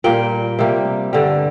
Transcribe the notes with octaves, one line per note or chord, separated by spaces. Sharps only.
A#2 G3 A#3 G5
C3 G3 A#3
G2 D3 G3